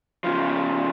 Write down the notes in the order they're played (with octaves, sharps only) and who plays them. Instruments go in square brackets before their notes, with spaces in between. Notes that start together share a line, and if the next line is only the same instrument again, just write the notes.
[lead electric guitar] C#3 F3